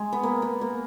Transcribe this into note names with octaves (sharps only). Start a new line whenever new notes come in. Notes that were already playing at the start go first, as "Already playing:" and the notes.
Already playing: G#3
B3
A#3
B3
A#3